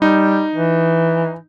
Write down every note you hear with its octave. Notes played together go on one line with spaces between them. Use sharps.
G3 D#4
E3